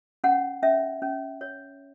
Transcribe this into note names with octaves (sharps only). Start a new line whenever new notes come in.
C#4 F#5
C#4 E5
C#4
C#5